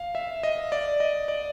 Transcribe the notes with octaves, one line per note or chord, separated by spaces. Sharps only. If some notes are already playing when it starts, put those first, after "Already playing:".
Already playing: F5
E5
D#5
D5
D#5
D5